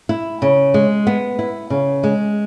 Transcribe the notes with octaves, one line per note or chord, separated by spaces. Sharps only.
E4
C#3
G#3
B3
E4
C#3
G#3